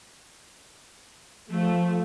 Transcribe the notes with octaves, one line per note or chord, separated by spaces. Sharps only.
F3 A3